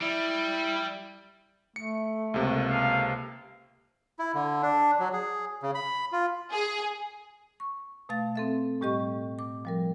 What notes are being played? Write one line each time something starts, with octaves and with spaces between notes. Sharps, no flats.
G3 E4
A3 C#7
C#2 C3 A#3
A4 F5
E4
D3
D4
F#3
G#4
C#3
B5
F4
G#4
C#6
B2 A3 F5 A6
C4 A4 E5
A2 G3 G4 D#5 C#6
D6
F3 G3 A#4